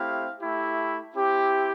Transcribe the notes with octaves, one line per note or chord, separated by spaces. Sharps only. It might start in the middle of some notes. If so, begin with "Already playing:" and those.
Already playing: A3 C4 E4 G4 F5
A3 E4 G4
C4 E4 G4